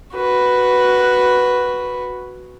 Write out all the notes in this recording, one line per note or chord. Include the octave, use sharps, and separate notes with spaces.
F#4 B4